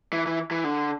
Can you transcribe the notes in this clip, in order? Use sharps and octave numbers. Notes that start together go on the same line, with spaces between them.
E3
E3
E3
D3